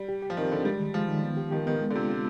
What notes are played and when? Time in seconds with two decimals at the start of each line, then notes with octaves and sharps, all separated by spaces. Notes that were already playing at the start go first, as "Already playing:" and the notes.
Already playing: G3
0.09 G4
0.22 G4
0.30 F3
0.37 D#3 C4
0.51 D3 C4
0.65 G3 G#3
0.80 D#3
0.94 F3 G#3
1.09 D#3
1.24 B3
1.37 G4
1.51 D#3 G4
1.66 D#3 B3
1.81 G#3
1.90 D3
1.95 C3 F4
2.10 F4